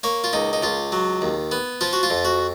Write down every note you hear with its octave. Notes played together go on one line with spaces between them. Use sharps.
A#3 C#5
F4
C#2 D#4
D#4
C#2 F4
F#3
D#2
B3
F3 F4
F#4
F4
F2
F#4